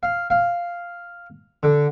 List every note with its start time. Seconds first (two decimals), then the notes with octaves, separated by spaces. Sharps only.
0.03 F5
0.30 F5
1.63 D3